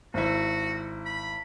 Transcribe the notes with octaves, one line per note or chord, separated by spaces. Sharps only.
G#1 E4 F#4
B5